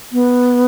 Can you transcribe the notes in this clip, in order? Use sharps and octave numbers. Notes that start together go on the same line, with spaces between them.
B3